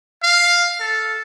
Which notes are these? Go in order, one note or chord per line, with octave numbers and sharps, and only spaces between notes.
F5
A4